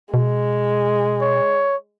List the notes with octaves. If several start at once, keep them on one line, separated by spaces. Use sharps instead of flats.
B2 G#3
C#5